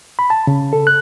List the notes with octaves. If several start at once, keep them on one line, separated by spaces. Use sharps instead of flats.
B5
A5
C#3
A4
F#6